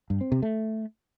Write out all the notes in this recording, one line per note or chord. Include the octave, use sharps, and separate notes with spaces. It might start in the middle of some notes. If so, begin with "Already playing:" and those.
G2
C4
C3
A3